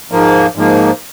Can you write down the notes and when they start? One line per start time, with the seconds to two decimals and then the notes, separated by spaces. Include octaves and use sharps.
0.12 G#2 F3 A#3
0.55 G#2 F3 A#3